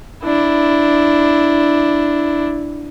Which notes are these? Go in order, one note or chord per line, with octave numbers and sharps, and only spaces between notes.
D4 E4